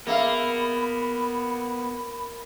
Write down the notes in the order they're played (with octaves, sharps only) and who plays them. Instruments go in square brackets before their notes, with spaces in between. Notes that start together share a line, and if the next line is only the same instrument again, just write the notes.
[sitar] A#3 [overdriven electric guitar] B3 [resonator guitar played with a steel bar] G#4 E5 F5 [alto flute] B5